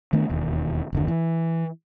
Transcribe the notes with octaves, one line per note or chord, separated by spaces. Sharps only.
D#3 A3 B3 D4
E1 D#2
F#1 D#2 D3
E3